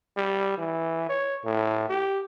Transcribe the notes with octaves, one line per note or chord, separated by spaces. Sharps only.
G3
E3
C#5
A2
G4